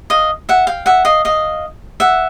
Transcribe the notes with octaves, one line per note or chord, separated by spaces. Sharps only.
D#5 F5
E5 F#5
F5 G5
E5 F#5
D#5 F5
D#5 F5
E5 F#5